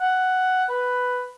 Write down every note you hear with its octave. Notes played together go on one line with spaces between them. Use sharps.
F#5
B4